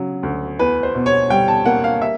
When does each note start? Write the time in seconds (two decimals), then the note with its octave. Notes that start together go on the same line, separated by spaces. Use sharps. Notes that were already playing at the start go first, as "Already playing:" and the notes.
Already playing: C#3 F#3
0.23 D2
0.59 E2 B4
0.83 C5
0.95 B2
1.06 C#5
1.30 G3 G5
1.48 A5
1.66 A#3 F#5
1.84 F5
2.02 E5